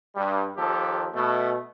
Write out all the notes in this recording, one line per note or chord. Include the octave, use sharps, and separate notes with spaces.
G2 G3
D#2 F3 G4 A4
B2 A3